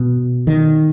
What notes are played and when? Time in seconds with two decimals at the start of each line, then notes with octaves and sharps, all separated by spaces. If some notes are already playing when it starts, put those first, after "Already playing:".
Already playing: B2
0.47 D#3